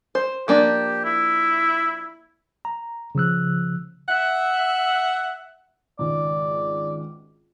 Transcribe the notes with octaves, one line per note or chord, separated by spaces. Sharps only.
C5
F3 A#3 D4 G4
E4
A#5
C#3 F3 E6 F#6
E5 F#5
G#1 C#2 G#2 D5